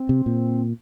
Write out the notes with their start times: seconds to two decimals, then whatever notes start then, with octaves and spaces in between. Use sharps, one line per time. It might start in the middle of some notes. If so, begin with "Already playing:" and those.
Already playing: C4
0.09 C3
0.26 A#2